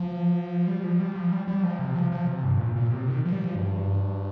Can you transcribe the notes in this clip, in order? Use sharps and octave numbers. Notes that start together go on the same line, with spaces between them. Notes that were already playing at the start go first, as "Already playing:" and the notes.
Already playing: F3
G3
F3
G3
F3
G3
G3
F3
C3
F3
F3
C3
G2
A#2
A#2
C3
D#3
F3
G3
F3
G2